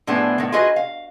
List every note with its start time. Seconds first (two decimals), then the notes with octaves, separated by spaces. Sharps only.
0.07 A2 F3 B3 D4 G#4
0.38 A2 D#3
0.52 F4 F#4 G#4 B4 D#5
0.76 F5